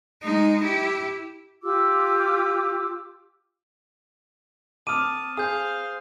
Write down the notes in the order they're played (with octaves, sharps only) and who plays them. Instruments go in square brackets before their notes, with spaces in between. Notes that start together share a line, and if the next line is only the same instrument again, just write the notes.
[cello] G#3 D#4
E4 G4
[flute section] F4 G4 D6 E6
[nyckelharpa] C4 A5 [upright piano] D6 F6 [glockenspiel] D#6 D#7
[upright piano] G#4 [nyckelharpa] C5 F5 [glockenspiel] D#6 G6